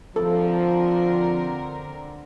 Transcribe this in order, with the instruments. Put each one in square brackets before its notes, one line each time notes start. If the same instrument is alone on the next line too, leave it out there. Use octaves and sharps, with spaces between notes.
[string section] D3 C4 A#4 [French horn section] F3 [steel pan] A4